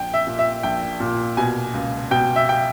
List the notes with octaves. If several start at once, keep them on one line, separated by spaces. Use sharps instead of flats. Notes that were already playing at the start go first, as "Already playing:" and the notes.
Already playing: A#1 G5
E5
A#2
E5
A#1 G5
A#2
B2 G#5
C#2
B2 G5
E5
G5